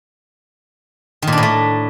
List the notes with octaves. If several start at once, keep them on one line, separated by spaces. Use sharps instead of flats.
D#3
A#2
D4
A2
A3